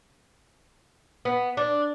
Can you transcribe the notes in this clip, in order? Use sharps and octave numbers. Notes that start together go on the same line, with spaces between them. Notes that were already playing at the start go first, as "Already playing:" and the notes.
B3
D4